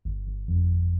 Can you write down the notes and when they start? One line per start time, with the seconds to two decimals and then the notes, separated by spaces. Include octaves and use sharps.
0.05 G1
0.27 G1
0.48 F2
0.70 G1